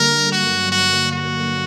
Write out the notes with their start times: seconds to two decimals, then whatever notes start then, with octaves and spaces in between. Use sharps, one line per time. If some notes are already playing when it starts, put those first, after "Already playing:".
Already playing: D3 G3 A#3 A#4
0.32 G2 D3 F#3 A#3 F#4
0.72 F#4
1.12 F#4